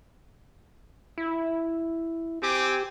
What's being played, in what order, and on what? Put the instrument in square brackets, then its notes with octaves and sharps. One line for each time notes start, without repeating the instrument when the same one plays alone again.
[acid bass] E4
[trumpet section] C4 G#5 D6 [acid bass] G4